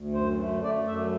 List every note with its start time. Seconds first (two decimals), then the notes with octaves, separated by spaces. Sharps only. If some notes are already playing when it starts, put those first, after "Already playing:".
Already playing: D2
0.14 F#2 C5
0.38 A3
0.63 A3 D5
0.87 F#2 E5